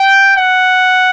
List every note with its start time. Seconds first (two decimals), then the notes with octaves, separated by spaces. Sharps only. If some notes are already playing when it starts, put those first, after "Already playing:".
Already playing: G5
0.37 F#5